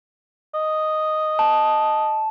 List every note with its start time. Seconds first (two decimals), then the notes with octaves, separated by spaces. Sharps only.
0.55 D#5
1.39 A5